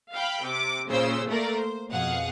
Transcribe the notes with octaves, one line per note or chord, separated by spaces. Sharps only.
F5 G5 B5
C3 D6
A#2 C#3 C5 E6
A3 A#3 A#4 D5
C5
F2 B2 G#4 F5 F#5